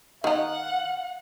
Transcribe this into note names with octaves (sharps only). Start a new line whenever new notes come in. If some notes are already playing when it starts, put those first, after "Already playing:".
D#3 D#4 F5 F#5